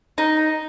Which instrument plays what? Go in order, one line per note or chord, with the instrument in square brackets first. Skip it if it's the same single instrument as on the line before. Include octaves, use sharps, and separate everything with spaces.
[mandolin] D#4